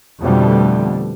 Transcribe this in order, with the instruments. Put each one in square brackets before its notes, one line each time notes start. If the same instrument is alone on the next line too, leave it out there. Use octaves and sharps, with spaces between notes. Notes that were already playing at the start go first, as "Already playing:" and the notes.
[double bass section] F2 B2 D3 G3 A3